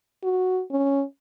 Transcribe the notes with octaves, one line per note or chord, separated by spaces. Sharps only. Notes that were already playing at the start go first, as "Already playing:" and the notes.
F#4
C#4